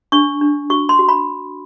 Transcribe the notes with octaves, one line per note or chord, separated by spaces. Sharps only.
D4 C#6
D4
F#4 C#6
C6
F#4
B5